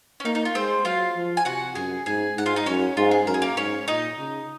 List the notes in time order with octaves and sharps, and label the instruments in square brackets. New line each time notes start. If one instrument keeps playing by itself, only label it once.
[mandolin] C#4
[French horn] A#3 [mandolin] D#4
[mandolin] D#4
F4
[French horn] G#3 [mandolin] C4 C5
[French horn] F#3 [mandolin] F4 F5
[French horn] F3
[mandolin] G#5
[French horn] C3 [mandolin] F#4 F#5
[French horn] F#2 [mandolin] G#4 G#5
[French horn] G#2 [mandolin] G#4 G#5
[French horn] G#2 [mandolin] F#5
[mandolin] F4 F5
D#4 D#5
[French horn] F#2 [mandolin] C#4 C#5
[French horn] G#2 [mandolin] F4
[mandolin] G#4
[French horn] F#2 [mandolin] A#4
[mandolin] G#4
A#3 A#4
[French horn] G#2 [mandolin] C#4 C#5
[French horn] A#2 [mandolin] D#4 D#5
[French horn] C#3